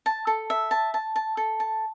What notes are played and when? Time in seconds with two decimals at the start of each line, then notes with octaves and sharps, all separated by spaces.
0.06 A5
0.27 A4
0.50 E5
0.71 A5
0.94 A5
1.16 A5
1.37 A4
1.60 A5